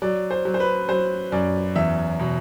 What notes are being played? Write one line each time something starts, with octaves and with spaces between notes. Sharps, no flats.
F#3 D5
C5
F#3
C5
B4
F#3 C5
F#2 D5
E2 E5
B2